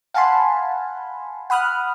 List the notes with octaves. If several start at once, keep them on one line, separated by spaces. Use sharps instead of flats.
F5 F#5 G#5 A5 B5 C6
F#5 B5 D#6 F6 F#6